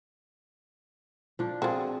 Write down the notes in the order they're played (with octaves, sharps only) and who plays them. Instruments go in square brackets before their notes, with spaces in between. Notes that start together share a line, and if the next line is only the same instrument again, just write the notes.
[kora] F3 D4
[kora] C4 G#4 [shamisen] F4 F#4